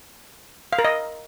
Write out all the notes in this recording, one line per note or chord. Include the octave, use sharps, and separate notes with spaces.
F5
A#4
D#5